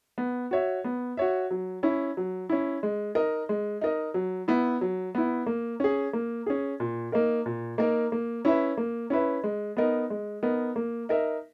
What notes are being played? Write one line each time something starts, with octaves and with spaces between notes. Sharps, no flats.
B3
F#4 C#5 E5
B3
F#4 C#5 E5
F#3
C#4 E4
F#3
C#4 E4
G#3
D#4 A#4 D#5
G#3
D#4 A#4 D#5
F#3
B3 E4
F#3
B3 E4
A#3
C#4 G#4
A#3
C#4 G#4
A#2
A#3 D#4 A#4
A#2
A#3 D#4 A#4
A#3
C#4 E4 B4 E5
A#3
C#4 E4 B4 E5
G#3
B3 D#4 A#4
G#3
B3 D#4 A#4
A#3
D#4 A#4 E5